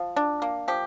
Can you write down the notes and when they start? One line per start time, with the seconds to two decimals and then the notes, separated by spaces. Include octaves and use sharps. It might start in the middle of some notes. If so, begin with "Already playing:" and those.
Already playing: F3
0.16 D4
0.42 A#3
0.68 F3 G4